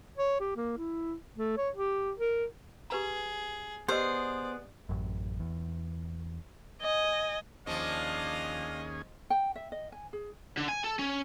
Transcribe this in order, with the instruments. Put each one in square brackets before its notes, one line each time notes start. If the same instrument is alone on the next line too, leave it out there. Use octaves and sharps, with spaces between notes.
[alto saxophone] C#5
G4
A#3
E4
A3
C#5
G4
A#4
[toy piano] G4 B4 A#5 [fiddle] G#4
[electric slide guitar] B3 G#4 [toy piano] G4 B4 D#5 [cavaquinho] C5 [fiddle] D5
[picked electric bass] A1 F#2
E2
[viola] D#5 G#5
[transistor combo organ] D#2 C#4 G#4 [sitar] F3 [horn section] D4 F5 [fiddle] D#5
[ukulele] G5
E5
D#5
G#5
G#4
[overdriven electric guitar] D3
G#5
A4
C#4